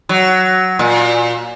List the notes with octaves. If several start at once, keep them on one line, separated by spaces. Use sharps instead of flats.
F#3
A#2